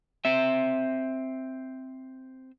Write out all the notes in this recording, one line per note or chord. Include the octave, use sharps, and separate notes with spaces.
C4 E5